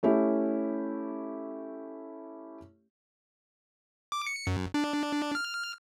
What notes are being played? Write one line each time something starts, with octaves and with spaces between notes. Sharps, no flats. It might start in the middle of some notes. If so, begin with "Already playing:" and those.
A3 C#4 E4 G4
D6
C#7
F#2
D4
F6